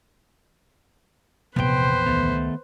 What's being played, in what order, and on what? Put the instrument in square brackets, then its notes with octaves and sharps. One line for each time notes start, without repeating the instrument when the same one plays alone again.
[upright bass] A#1 E2 [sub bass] C3 [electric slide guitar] B3 G5 [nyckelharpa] B4 C5
[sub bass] C#2 [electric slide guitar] D#3 A3 B3